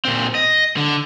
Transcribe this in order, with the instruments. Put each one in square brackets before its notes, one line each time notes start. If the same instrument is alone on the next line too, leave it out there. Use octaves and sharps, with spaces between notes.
[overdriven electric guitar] A#2 C4
D#5
D3